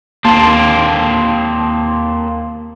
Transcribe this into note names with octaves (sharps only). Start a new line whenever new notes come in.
D#2 A#3 C4 A5 C6